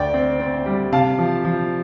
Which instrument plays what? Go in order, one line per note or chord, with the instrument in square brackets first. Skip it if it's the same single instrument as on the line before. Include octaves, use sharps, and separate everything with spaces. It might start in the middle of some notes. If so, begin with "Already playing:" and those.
Already playing: [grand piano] D2 D5 G5
C4
C4
G3
C3 F5 A5
F3
F3